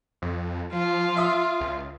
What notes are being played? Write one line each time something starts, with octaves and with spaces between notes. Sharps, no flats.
F2
F3 F4
E5 D#6
C#2